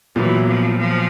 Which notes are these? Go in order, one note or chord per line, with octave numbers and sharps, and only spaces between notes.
A#2 E3 F#3 B3
F3
F3